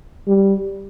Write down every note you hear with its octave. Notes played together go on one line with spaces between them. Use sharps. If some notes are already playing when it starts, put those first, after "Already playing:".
G3